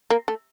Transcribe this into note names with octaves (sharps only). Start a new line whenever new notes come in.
A#3
A3